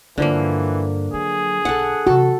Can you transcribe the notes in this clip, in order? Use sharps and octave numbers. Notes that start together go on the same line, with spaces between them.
G2 D3 E3 F3 A#3
F#3 G#4
B1 A4 F#5
C3 E3 F#4 A4